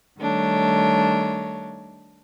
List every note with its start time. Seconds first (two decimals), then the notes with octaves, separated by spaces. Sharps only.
0.20 D#3 G3 A3 D4 C#5